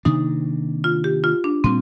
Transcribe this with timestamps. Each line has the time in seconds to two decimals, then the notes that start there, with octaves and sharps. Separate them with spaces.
0.05 C3 D#3 A#3 D4 D#4
0.84 F4
1.04 G4
1.24 F4
1.44 D4
1.64 A#2 G3 C4